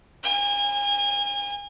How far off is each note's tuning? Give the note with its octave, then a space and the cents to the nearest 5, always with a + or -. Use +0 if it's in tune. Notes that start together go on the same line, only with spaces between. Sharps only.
G#5 -35